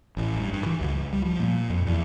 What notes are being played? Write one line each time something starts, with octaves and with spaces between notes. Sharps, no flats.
A1
G2
G2
E3
C#2
G3
F3
A#2
F2
E2